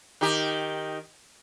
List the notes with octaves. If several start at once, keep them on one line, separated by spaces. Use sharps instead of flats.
D#3 G4